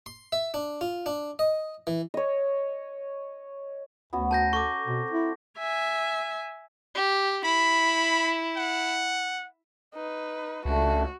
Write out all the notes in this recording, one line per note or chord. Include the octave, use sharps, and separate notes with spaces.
C6
E5
D4
F4
D4
D#5
E3
C#5 D#5
D2 B3 C#4 F#4
A#4 A5 G6 A#6
A4 C#6 D6
B2 C4
E4
E5 G#5
G4
E4 B5
F#5
D#4 B4
C#2 A3 D4 F#4